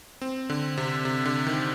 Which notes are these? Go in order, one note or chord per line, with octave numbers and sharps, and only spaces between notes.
C4
D3
C3
C3
D3
D#3